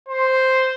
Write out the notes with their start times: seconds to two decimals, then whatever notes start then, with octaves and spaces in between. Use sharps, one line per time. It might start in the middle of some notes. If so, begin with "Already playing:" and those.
0.09 C5